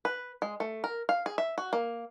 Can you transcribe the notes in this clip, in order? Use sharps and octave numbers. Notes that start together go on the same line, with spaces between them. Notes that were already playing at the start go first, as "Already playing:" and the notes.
B4
G#3
A3
A#4
F5
G#4
E5
F#4
A#3